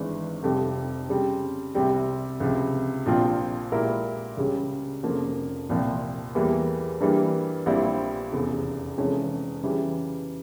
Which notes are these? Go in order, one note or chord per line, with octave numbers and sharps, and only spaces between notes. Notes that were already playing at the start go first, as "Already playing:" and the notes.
Already playing: G#1 G2 E3 G#3
F1 F2 C3 G3
C#3 G3 C4
C2 C3 G3 C4
C#2 C3 F3
A#1 A#2 F3 C4 F4
A#2 G#3 E4 G4 A#4
C#2 C#3 G3 C#4
F1 F2 C#3 F3 A#3
C2 A#2 F3 C4
E2 E3 G3 A#3
G2 E3 G3 A#3
A#1 A#2 G3 C4 E4
F1 E2 C#3
F1 F2 E3 G#3 C#4
C#3 E3 G3